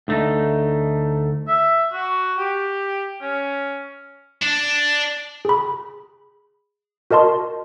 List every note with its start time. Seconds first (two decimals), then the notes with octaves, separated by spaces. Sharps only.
0.08 D2 A3 D#4
1.48 E5
1.93 F#4
2.38 G4
3.21 C#4
4.43 D4
5.45 G#4 B5
7.11 F#4 A#4 D#5 A5 C6